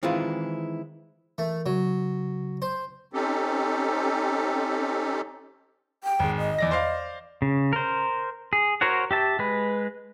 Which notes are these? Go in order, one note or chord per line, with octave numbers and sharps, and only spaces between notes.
D#3 E3 G#3 C4 E4 F4
E3 A3 A#4
C#3 F#3
C5
C4 C#4 D#4 G4 A4
G5
G#1 G#3
D#5
E2 D5 A#6
C5 D5 F5
C#3
A#4 C5
G#4
F#4 A#4 C5 C#5 F#5
G4 E5 A5
G#3 B4